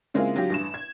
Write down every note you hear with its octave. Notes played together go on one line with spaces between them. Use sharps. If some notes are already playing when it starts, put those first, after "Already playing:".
C#3 G#3 A#3 C4 E4 F4
D3 F#3 F4 G4
A1 G2 E7
G#6